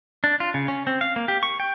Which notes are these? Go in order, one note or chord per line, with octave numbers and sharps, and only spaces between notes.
D4
F4
C#3
C#4
C4
F5
A#3
G4
C#6
G5